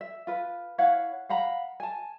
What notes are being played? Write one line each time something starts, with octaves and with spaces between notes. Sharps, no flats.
E5
F4 B4
E4 C#5 F5 F#5
F5 F#5 A#5 B5
G#5 A5